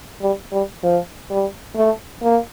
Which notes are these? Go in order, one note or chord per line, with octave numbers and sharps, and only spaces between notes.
G3
G3
F3
G3
A3
A#3